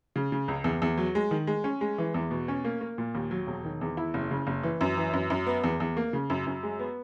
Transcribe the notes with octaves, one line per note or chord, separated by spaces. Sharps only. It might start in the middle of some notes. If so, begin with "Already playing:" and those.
C#3
C#3
C#2
E2
E2
F#3
G#3
D#3
G#3
C#4
G#3
E3
E2
B2
C#4
A#3
A#3
A#2
D#2
F#3
E1
D#3
E2
E4
F#1
C#3
F#1
E3
F#2
E3
F#2
F#2
B3
E2
E2
A#3
C#3
F#2
F#2
G#3
B3